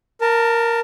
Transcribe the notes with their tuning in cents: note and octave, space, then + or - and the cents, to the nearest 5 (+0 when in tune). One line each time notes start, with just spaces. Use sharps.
A#4 +0 A5 +25